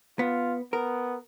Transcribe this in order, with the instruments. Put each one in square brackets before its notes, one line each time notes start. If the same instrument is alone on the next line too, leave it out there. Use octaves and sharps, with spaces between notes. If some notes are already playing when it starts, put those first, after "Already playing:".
[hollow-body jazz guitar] B3 [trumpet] F4
[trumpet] B3 [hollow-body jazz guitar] A#4